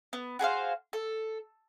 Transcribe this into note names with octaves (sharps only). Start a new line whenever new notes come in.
B3
F#4 G#4 C5 F5
A4